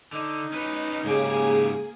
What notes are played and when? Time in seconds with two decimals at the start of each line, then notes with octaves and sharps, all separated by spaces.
0.13 D3 D#4
0.52 C#4 B4
1.04 G#2 C#3 A#3 G4 G#4